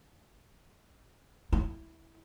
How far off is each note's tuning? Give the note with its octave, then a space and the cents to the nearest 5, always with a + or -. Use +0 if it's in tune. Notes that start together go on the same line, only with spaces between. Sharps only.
E4 -15